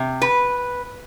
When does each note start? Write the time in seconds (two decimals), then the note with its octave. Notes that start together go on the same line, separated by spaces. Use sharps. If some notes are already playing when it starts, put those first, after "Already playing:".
Already playing: C3
0.22 B4